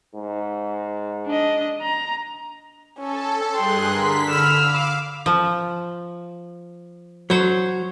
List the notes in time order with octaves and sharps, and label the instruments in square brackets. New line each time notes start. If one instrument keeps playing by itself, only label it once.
[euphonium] G#2
[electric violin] D4 D#5
A#5
[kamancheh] C#4 [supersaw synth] A4
[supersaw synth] G2 G#4 F#6 [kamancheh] G5 [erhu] C6
[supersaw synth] D3 B6 [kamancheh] A#4
[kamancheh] B5 E6 [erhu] F6
[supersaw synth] F5 D6
[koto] F3
[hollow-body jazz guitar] F#3 [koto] C5 C#5